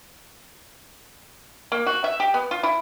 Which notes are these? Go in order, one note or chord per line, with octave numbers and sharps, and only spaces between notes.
A#3
F#4
E5
G4
B3
F4
E4